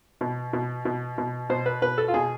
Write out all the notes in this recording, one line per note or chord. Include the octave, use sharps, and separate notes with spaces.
B2
B2
B2
B2
B2 C5
B4
B2 B4
A4
F4
B2 G#4